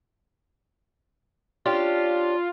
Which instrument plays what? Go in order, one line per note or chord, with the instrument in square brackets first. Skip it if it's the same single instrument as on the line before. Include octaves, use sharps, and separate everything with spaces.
[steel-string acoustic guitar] C#4 D4 G4 [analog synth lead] F4